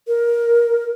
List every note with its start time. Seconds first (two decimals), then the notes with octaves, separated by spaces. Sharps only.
0.08 A#4